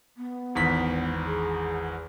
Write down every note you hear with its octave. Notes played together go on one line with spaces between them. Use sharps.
B3
G#1 E2 B6
G#4